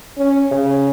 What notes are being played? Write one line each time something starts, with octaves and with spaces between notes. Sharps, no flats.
C#4
C#3